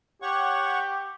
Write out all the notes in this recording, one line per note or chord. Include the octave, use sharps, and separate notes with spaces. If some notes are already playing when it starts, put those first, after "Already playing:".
G4 C#5 F#5 C#6